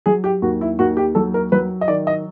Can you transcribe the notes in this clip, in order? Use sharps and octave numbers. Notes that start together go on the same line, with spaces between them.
F#3 G#4
G4
D#2 F#4
E4
D#2 F#4
G4
F#3 A4
A#4
F#3 B4
D#5
D#3 D5
D#5